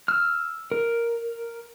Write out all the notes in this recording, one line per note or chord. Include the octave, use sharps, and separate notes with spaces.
E6 F6
A#4